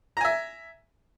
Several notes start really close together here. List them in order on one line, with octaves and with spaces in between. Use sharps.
A#5 G#5 E5